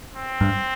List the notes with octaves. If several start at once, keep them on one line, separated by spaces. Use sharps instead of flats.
C4
G2